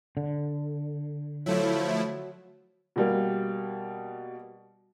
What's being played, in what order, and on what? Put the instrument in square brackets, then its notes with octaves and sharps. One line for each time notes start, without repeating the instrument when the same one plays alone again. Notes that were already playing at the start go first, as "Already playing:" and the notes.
[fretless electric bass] D3
[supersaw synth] F3 A3 E4 [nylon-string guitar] F#3
[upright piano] B2 G3 A#3